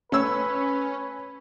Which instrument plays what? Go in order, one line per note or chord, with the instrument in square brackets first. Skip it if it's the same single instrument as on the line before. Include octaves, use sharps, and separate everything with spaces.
[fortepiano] A3 C#5 E6 [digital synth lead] C#4 [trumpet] B4